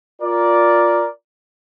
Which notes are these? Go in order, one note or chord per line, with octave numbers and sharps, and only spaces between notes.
F4 A#4 D5